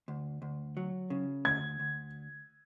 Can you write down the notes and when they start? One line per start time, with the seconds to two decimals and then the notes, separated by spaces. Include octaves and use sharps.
0.08 D2
0.42 D2
0.77 F#3
1.10 C#3
1.45 D2 G#6
1.80 D2